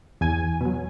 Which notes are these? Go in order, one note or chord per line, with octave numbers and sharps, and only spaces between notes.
E2 G#5
B2 F#3